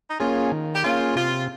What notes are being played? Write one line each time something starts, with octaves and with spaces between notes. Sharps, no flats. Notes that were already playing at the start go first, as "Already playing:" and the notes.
D#4
A#3 C#4 F4 G#4
D#3
G4
A#3 C#4 F4 G#4
C3 F4